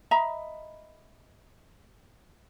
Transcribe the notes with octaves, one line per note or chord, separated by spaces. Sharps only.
D#5 E5 A#5 B5